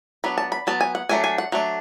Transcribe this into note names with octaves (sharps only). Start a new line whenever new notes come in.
F#3 B3 D4 B5
A5
B5
F#3 B3 A5
G#5
F#5
F#3 A3 D4 G#5
G#5
F#5
F#3 A3 D4